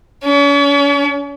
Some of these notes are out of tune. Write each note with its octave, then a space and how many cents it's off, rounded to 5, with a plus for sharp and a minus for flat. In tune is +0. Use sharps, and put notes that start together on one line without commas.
C#4 +40